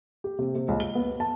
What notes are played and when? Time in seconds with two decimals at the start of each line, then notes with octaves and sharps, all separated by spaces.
0.24 G4
0.39 C3
0.55 C3
0.68 C#2
0.80 G7
0.95 B3
1.20 A5